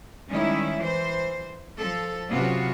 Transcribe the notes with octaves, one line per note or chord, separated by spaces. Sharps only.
D#3 G3 G#3 C#4 E4
E3 C5
F3 A4
C3 F#3 B3 C#4 F4 F#4